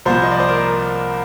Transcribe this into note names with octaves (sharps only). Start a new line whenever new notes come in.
C2 A#2 F3 C5
D#5
D5
C5
A#4